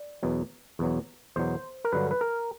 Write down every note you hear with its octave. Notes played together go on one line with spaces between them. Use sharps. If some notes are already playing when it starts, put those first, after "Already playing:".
Already playing: D5
E2 B2 F#3
E2 B2 F#3
E2 B2 F#3 C5
A#4
G2 D3 F#3 B4
B4
A#4